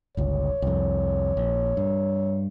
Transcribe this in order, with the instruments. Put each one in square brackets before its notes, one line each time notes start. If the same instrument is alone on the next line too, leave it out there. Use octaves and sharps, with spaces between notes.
[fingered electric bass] G1 C#2 [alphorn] C#5
[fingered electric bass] C2 F2
A#1
G2